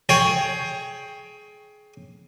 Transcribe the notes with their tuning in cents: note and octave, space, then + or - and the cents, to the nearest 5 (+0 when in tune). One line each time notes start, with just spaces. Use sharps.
G#4 +20 C#5 +0 G5 +15